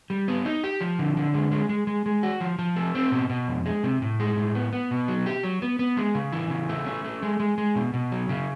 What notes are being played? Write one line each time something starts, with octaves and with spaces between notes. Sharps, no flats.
G3
B3
D#4
G4
F3
D3
D3
G#3
G#3
G#3
G#3
G#3
F#4
F3
F3
A3
C4
B2
B2
F2
G#3
C3
A2
G#3
A2
B3
B3
B2
F#3
G4
F#3
B3
B3
G#3
C#3
E3
C#3
A3
C#4
A3
G#3
G#3
G#3
B2
B2
F#3
C#3